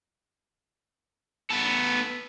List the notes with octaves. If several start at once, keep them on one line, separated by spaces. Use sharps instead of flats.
B3 A4